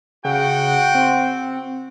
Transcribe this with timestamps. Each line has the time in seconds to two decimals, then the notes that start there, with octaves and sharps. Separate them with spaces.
0.25 C#3 F#4 F#5 G5
0.95 C4